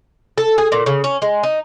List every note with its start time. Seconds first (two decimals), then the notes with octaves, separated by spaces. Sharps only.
0.38 A4
0.58 G#4
0.72 A#2
0.86 C#3
1.04 C#4
1.22 G#3
1.43 D#4